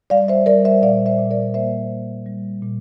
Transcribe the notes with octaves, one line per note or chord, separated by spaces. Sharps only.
G3 D5 F5
C5 E5
G3 A#4 D5
C5 E5
A#2 D5 F5
C5 E5
A#2
A#4 D5
A#3 C5 E5
A#3
G3
A#2